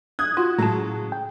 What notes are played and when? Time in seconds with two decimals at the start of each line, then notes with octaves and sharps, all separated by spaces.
0.19 D#6 F#6 G#6
0.37 F4 F#4
0.58 A2 C#3 F#3 G#3 A5 A#5
1.12 G5